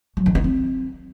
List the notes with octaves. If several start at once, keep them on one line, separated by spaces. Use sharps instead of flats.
F#3
D#3
D#4
C4